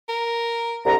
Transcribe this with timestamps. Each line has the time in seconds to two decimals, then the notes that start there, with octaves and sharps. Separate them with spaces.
0.09 A#4
0.85 C2 D3 A#5